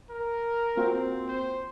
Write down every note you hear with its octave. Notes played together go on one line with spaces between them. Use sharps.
A#4
A#3 C4 F4 F#4
C5